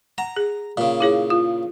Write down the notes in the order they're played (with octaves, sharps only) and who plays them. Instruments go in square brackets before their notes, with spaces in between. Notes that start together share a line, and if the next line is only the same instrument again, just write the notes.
[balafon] F#5 [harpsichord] A#5
[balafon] G#4
[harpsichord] A#2 C#3
[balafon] E4 G#4 C#5
F4